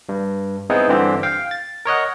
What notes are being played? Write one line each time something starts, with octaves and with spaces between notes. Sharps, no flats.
G2
G#3 B3 C4 D#4 E4
G2 D3 E3 C4 G4
F5 G5
A6
A#4 C#5 D#5 F#5